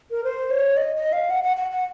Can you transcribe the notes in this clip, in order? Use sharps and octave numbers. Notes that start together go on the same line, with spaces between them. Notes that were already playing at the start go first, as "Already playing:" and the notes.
A#4
C5
C#5
D#5
D#5
F5
F#5
F#5
F#5
F#5